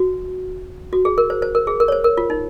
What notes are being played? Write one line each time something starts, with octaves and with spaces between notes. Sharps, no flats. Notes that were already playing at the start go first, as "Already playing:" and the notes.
Already playing: F#4
F#4
G#4
A#4
C5
C5
A#4
G#4
A#4
C#5
C5
A#4
F4
D#4